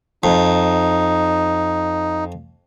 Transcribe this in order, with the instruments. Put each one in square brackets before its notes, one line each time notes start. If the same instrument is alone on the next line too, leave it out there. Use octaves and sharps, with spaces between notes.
[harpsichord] F2 [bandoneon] D#4